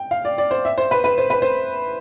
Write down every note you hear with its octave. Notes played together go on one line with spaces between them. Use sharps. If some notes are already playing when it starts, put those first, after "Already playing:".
Already playing: G5
F5
D5
D5
C5
E5
C5
B4
B4
C5
B4
C5